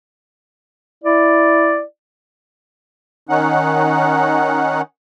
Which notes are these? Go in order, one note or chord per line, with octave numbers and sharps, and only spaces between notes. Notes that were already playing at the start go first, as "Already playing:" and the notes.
E4 D5
D#3 C#4 D#4 F#5